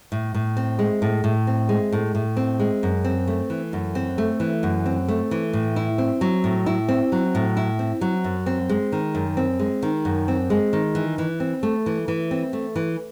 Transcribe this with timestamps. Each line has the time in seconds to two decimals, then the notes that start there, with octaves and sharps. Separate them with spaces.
0.12 A2
0.34 A2
0.57 C4
0.79 G#3
1.02 A2
1.24 A2
1.47 C4
1.69 G#3
1.92 A2
2.15 A2
2.37 C4
2.59 G#3
2.83 F#2
3.05 C4
3.27 A3
3.50 E3
3.73 F#2
3.95 C4
4.18 A3
4.40 E3
4.63 F#2
4.86 C4
5.08 A3
5.31 E3
5.53 A2
5.76 E4
5.98 C4
6.21 F#3
6.44 A2
6.66 E4
6.88 C4
7.12 F#3
7.35 A2
7.57 E4
7.79 C4
8.01 F#3
8.24 F#2
8.46 C4
8.69 G#3
8.92 D#3
9.15 F#2
9.37 C4
9.59 G#3
9.82 D#3
10.05 F#2
10.28 C4
10.50 G#3
10.73 D#3
10.95 E3
11.18 E3
11.40 C4
11.63 A3
11.86 E3
12.08 E3
12.31 C4
12.53 A3
12.76 E3